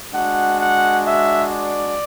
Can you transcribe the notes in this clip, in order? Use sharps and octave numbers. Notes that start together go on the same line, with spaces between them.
G#3 D4 F#4 F#5
F#5
E5
D5